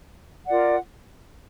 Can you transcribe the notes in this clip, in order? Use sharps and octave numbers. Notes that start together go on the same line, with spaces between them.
F4 A#4 D5 F#5